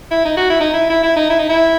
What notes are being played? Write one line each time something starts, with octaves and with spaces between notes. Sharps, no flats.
E4
D#4
F#4
E4
D#4
E4
E4
E4
D#4
E4
D#4
E4